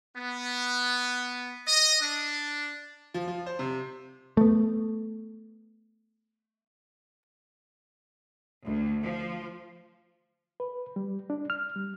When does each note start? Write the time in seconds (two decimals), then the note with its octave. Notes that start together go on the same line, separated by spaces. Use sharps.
0.16 B3
1.65 D#5
2.00 D4
3.14 F3
3.28 F3
3.46 C5
3.59 C3
4.37 A3 B3
8.64 D2
9.03 F3
10.60 B4
10.96 G3
11.30 D4
11.50 F6
11.76 G3